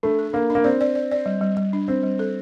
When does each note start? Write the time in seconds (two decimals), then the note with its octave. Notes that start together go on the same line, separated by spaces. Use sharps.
0.03 A3 D4
0.19 A4
0.33 A#3 D4
0.50 D4
0.55 A#3
0.64 C4 D5
0.81 D5
0.95 D5
1.11 D5
1.26 G3
1.41 G3
1.57 G3
1.73 D4
1.88 C4 D4
2.03 G3
2.19 A4